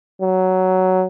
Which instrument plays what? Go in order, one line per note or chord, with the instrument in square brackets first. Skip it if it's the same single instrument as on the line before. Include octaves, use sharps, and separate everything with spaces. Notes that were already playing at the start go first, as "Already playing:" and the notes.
[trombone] F#3